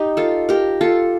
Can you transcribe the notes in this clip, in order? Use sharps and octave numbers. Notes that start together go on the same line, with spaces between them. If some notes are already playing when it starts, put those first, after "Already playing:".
Already playing: D#4 G4
F4 A4
G4 A#4
F4 A4